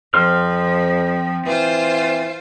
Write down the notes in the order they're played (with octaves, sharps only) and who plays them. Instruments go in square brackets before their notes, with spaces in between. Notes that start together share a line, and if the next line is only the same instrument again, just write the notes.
[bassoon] F2 [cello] F3 [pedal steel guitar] C4 C6 F6
[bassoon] E3 [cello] F4 C5